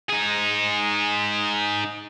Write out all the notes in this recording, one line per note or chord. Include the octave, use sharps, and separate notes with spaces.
D#4 G#4